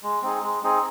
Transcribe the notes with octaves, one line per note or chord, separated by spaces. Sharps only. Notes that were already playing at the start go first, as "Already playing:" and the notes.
G#3
C4 D#4 G#4
G#3
C4 D#4 G#4